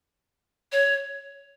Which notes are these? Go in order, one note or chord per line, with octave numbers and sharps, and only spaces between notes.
C#5